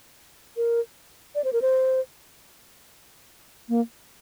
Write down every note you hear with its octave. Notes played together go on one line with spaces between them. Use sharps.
A#4
D5
C5
A#4
C5
A#3